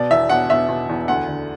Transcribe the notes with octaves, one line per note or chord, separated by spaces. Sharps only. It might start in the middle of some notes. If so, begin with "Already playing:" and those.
Already playing: B2 D5
E2 E5
B2 F#5
B2 E5
B2
E2
D2 F#5
D3